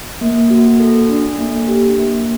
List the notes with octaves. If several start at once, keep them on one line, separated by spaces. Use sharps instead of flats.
A#3
F#4
A4
D4
A#3
G4
A#3